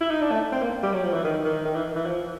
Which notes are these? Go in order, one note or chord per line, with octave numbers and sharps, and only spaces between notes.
E4
D#4
D4
A3
C4
A#3
G3
F#3
F3
E3
D#3
D#3
D#3
E3
E3
F3